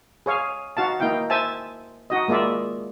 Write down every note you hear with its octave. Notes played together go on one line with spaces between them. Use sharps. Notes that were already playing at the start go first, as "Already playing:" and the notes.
G#4 C#5 F5
D#4 F#4 F5 A5
A#3 D#4 E4 F5 G5
C5 E5 G#5 A5
D#4 F#4 D#5
G#3 A#3 F4 D5 E5